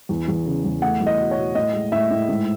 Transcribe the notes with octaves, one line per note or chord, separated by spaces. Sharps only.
E2
E2
C#3
E2
A3 F#5
E2
D#5
B2
C#5
B2
A2 D#5
G#3
A2 E5
A2
G#2